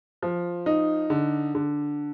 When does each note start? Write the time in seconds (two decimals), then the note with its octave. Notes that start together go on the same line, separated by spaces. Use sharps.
0.23 F3
0.66 D#4
1.10 D3
1.55 D3